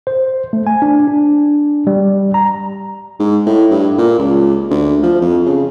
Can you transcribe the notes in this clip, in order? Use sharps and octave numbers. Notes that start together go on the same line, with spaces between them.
C5
A3
G#5
D4
D4
G3
A#5
G#2
A2
G2
A#2
C#2
D2
F3
F2
C#3